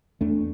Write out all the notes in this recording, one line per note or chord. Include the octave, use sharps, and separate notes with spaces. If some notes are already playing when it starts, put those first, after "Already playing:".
E2 A3 D4